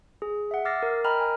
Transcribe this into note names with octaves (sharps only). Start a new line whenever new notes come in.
G#4
E5 F#5
D6 E6 F6 A6 A#6 C7
A#4
A#4 D#5 G5 A#5 B5 F6
G#5